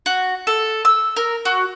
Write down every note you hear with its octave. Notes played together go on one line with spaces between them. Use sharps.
F#4
A4
E6
A#4
F#4